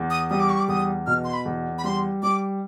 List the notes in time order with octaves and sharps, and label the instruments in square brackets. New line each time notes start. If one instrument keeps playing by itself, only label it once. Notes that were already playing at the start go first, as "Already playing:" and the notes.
Already playing: [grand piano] E2
[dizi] D#6
[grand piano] G3 [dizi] D#6
[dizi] D6
C#6
D6
[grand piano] E2 [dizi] D#6
[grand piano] B2 [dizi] F6
[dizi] C6
B5
[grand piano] E2
[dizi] B5
[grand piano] G3 [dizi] C6
[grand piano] G3 [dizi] D6